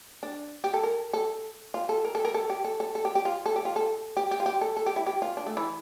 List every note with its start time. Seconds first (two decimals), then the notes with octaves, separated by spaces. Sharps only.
0.23 D4
0.64 G4
0.74 A4
0.83 A#4
1.13 A4
1.74 F4
1.89 A4
2.05 A#4
2.15 A4
2.25 A#4
2.34 A4
2.50 G4
2.65 A4
2.80 A4
2.95 A4
3.05 G4
3.15 G4
3.25 F4
3.46 A4
3.56 G4
3.65 F4
3.76 A4
4.17 G4
4.31 G4
4.40 F4
4.46 G4
4.61 A4
4.77 A4
4.86 G4
4.96 E4
5.06 G4
5.22 F4
5.37 D4
5.46 A3
5.57 E3